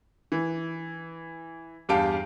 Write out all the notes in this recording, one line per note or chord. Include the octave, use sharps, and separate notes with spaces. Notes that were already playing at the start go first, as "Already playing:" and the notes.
E3
E2 G2 G4 F5 A5 D7